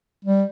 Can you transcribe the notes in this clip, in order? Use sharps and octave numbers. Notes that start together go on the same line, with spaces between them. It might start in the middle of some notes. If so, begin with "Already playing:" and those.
G3